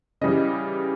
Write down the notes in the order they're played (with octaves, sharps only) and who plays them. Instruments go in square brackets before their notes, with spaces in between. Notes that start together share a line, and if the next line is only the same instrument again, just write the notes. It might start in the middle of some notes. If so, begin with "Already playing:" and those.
[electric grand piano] C#3 E3 G3 D#5